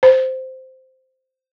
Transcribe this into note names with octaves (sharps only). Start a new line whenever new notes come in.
C5